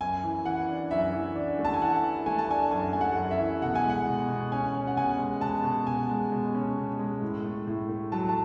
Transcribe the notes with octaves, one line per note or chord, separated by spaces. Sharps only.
F#2 G#5
E3
E3 F#5
D4
F#2 E5
E3
D4
A3
A5
G#5
E3 F#5
E3
A3 G#5
A5
D4 G#5
F#2 G#5
A3 G#5
F#5
F#2
E5
E3
B2 F#5
G#5
G#3
F#5
B2
B2
C#4 G#5
C#4
F#5
B2 G#5
G#3
B2 A5
B2
B2 G#5
G#3
B2
C#4
B2
G#3
A2
A3
A2
A3
F#3 A5
A5